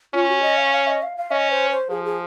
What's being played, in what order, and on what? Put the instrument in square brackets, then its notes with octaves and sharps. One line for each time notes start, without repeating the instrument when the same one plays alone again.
[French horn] C#4 [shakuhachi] F4
[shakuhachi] F#4
D#5
F5
F5
D#5
F5
F5
[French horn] C#4 [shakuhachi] D#5
[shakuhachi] C5
C5
[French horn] F3 [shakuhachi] G#4
[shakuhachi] G#4